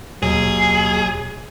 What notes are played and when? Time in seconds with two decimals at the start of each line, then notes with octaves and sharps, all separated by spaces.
0.22 D#2 B2 F#3 G#4